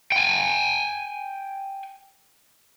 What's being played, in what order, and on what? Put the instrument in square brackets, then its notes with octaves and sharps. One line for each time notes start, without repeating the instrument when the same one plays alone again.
[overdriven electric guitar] G5 G#5